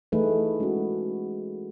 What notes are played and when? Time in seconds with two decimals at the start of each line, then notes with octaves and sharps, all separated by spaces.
0.12 E3 A3 D#4 G#4 B4
0.60 G#3 C#4 F#4